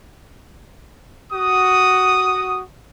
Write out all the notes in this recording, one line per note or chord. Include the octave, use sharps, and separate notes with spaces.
F#4 D#6